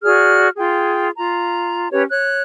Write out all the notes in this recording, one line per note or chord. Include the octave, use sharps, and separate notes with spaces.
F#4 G#4 D5 F6
F4 G#4 G5
F4 A#5
C#4 G4 B4 C#5
C#5 F#6